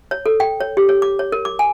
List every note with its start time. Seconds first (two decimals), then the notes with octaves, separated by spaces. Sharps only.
0.11 C#5
0.26 A4
0.40 G5
0.61 C#5
0.77 G4
0.89 C#5
1.02 D6
1.19 C#5
1.32 A#4
1.45 D6
1.59 G#5